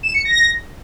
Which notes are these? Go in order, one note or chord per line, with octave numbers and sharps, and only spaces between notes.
E7
C#7
A#6